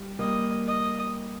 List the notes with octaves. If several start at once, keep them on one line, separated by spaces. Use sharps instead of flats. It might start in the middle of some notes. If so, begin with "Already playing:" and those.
Already playing: G3
G3 A#3 D#5
D#5